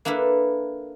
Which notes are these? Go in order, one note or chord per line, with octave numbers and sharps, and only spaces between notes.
A#3 D4 E4 A4 B4